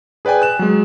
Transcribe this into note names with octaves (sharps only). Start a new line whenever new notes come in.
G#4 B4 D5 G5 G#5
F#6 E7
F#3 G#3